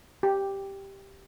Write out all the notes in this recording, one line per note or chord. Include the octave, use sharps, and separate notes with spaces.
G4